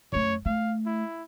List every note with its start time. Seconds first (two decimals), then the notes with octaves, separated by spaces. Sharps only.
0.13 F#2 A3 C#5
0.46 A3 F5
0.86 E4